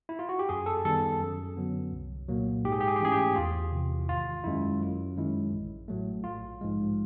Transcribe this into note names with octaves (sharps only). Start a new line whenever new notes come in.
E4
F4
F#4
G4
F#2 G#4
A4
D#3 G3 B3 A4
F#2
D3 F#3 B3
C2
A#2 F#3 A#3
G#2 G4
G#4
G4
G#4
G4
E3 A3 C#4 E4 G#4
G4
E2 F4
C3 E3
G#1 F4
F#2 D#3 G#3 C#4 E4
F#2
D#3 G#3 C#4 E4
A1
A2 F#3 A3
A#1 F4
G#2 F3 G#3